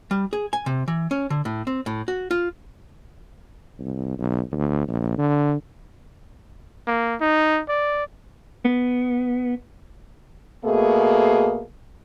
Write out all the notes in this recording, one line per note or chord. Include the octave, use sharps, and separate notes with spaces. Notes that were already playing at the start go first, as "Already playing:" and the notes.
G3
G#4
G#5
C3
E3
C#4
D3
A2
C4
A2
F#4
F4
C2
B1
D2
A#1
D3
A#3
D#4
D5
B3
B2 A3 A#3 G#4